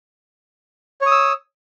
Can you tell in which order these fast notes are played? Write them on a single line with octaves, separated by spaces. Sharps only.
C#5 D#6 E6